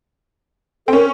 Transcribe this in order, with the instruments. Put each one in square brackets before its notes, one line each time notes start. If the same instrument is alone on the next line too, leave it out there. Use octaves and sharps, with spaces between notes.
[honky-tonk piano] C4 [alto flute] A4
[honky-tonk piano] C#4 [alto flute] A#4